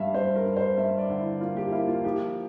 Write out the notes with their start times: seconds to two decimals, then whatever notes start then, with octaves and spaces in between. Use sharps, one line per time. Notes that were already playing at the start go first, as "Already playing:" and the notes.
Already playing: G2 G3 E5 F5
0.14 G2 C5
0.36 A#4
0.46 G2
0.57 C5
0.77 G2 E5
0.98 D5
1.10 D3
1.19 E4
1.41 A#3 F4
1.56 G4
1.72 A#3 E4
1.88 F4
2.04 F3 G4